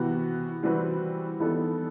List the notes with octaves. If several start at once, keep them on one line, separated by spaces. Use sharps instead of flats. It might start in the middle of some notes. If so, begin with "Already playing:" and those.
Already playing: C3 E3 B3 F#4 B4
E3 G3 C4 F#4 B4
E3 G3 B3 D#4 A4